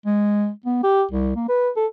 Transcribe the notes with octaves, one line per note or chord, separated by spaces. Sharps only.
G#3
B3
G4
C2
A#3
B4
A4